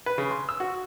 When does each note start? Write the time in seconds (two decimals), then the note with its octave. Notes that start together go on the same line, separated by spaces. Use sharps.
0.06 B4
0.18 C#3
0.31 C6
0.49 E6
0.60 F#4